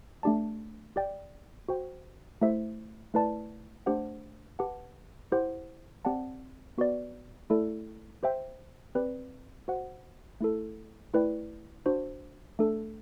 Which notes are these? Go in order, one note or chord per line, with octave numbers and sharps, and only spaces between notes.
A3 D4 G4 D5 A5
G4 D5 G5
F#4 C5 G5
A3 E4 G4 C5 E5
A3 E4 B4 D5 A5
A3 D4 G4 C5 F#5
G4 B4 F#5 A5
E4 G4 C5 F#5
C4 G4 D5 F#5 A5
B3 F#4 B4 D5
A3 E4 A4 D5
G4 C5 E5 G5
C4 G4 B4 D5
F#4 C5 F#5
A3 E4 A4
A3 E4 B4 D5 G5
D4 F#4 C5
A3 D4 A4